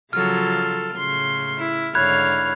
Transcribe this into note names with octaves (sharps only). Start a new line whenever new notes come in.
C#3 F3 F#3 F4 A4 F6
A2 C#3 C6
E4
G#2 D3 E4 C#5 F5 B5 F#6 G#6